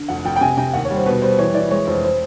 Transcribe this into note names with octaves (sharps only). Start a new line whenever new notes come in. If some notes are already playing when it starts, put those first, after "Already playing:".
Already playing: D3
F1 F#5
F1 G5
G5
C3 G#5
C3 G5
D#2 F#5
C#5
G3
C5
B2 B4
G3 C5
E3 C#5
E3 D5
G#3 C#5
F1 C5
C5